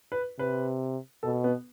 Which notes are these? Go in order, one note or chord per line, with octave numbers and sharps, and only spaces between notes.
B4
C3 B4
B2 A4
B3